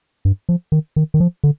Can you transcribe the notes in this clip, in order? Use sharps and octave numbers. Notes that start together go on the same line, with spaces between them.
G2
F3
D#3
D#3
D#3
F3
D3